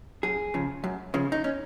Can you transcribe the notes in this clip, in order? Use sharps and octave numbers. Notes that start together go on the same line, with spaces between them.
F#2 G#4
C#3 F3
F#2
C#3 F3
D#4
C#4